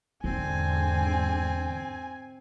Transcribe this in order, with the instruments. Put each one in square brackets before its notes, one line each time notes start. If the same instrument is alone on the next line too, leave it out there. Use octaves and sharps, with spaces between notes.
[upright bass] E2 [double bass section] G#2 D3 [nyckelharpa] C4 [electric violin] G#5